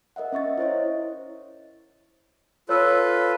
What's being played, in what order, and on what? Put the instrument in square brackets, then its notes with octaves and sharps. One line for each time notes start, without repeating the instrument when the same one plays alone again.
[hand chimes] A#4 D#5 E5 F#5
C#4 E5 C#6 A6
E4 C5 C#5 D#5
[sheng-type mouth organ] F4 A4 B4 [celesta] C#5 E6